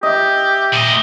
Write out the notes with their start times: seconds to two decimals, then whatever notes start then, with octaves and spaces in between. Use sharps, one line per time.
0.03 G4 D#5 E5
0.73 A#2 D#5